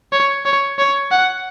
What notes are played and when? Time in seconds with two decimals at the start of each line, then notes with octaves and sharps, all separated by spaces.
0.12 C#5
0.45 C#5
0.79 C#5
1.11 F#5